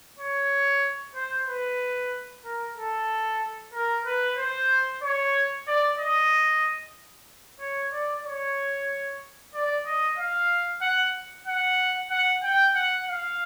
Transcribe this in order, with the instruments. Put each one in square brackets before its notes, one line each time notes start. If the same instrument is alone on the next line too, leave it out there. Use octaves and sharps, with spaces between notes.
[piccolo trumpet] C#5
C5
B4
A#4
A4
A#4
B4
C5
C#5
D5
D#5
C#5
D5
C#5
D5
D#5
F5
F#5
F#5
F#5
G5
F#5
F5